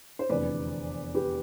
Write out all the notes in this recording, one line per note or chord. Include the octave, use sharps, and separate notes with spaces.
C5
F1 E2 D3 B4 D5
G4 B4